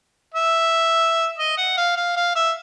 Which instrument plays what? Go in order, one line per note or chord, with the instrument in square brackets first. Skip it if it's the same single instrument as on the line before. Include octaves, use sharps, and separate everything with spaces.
[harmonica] E5
D#5
F#5
F5
F5
F5
E5